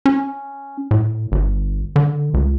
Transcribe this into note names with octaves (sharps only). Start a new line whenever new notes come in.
C#4
A2
G1
D3
C#2